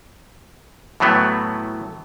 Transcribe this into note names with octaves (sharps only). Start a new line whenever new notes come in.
A2 E3 F#3 A3 B3